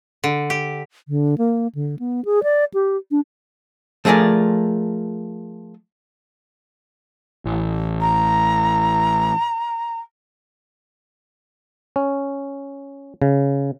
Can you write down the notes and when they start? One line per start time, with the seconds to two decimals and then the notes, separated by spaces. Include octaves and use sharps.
0.24 D3
0.50 G4
1.08 D3
1.38 A#3
1.75 D3
1.99 B3
2.25 G#4
2.43 D5
2.74 G4
3.11 D4
4.05 F3 A3 G#4 A#4 D5
7.45 A1
8.00 A#5
11.96 C#4
13.22 C#3